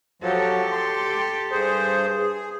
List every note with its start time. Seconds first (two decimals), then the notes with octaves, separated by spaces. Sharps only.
0.22 F3 F#3 G4 A4
0.72 C6
1.51 G2 G#4 C5
2.19 G#4